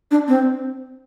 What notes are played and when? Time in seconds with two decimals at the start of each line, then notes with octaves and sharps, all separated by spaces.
0.11 D4
0.28 C4